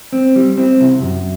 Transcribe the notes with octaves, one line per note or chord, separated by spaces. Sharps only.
C4
G3
C4
C2
F#2